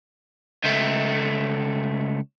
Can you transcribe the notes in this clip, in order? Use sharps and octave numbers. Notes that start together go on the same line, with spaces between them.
C#2 A3